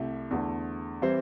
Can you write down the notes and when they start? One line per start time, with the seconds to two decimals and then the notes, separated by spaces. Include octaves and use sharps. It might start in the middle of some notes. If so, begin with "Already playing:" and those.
Already playing: C2 A3 E4 G4
0.31 E2 D3 A3
1.02 E3 G3 C4 E4 C5